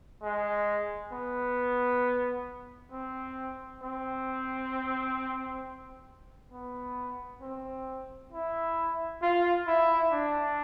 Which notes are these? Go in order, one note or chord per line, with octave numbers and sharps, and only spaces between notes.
G#3
B3
C4
C4
B3
C4
E4
F4
E4
D4